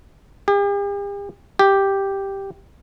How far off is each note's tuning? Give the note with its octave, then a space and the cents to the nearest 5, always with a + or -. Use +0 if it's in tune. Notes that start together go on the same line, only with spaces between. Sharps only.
G4 +45
G4 +0